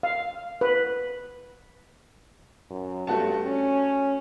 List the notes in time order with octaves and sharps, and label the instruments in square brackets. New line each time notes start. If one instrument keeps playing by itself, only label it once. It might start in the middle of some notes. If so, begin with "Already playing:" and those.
[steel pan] F5
B4
[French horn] F#2
[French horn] G2 [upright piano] A3 F#4 A5
[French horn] C#4